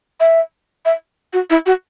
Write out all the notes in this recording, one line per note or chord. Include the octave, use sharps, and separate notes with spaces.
E5
E5
F#4
E4
F#4